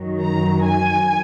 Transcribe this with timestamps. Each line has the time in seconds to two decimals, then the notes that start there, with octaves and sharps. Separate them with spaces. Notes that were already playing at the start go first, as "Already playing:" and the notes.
Already playing: F#2 D#3 F#3
0.21 A#5
0.64 G#5